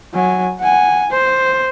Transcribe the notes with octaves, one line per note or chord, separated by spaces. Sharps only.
F#3 G#5
F#5 G#5
C5